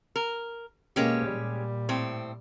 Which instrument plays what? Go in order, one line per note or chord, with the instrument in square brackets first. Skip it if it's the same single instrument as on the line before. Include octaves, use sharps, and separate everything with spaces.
[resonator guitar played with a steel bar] A#4
[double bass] B2 A#3 [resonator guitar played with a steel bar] G#3 C#4 G4
[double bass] A#2 G3
[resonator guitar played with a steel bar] A2 C4